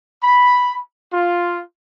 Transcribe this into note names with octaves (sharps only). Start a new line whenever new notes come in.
B5
F4